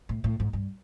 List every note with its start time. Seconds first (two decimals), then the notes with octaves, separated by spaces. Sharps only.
0.09 A2
0.24 A2
0.40 G#2
0.53 G2